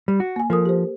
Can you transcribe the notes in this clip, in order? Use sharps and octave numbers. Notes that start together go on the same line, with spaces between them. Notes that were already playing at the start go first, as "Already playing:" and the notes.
G3
F#4
A#3 G#5
F3 A4 A#4 D#6
G4 C5